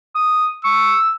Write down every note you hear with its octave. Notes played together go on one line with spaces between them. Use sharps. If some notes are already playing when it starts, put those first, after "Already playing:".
D#6
C#6 E6